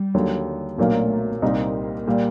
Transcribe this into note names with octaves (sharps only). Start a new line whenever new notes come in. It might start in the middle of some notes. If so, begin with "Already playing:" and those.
Already playing: G3
D#2 D3 F#3
B1 A#2 F#3 A3 A#3 D4
C2 A#2 G3 A#3 C4 D#4
A#2 G3